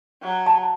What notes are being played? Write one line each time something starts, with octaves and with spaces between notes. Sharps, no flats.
F#3
A5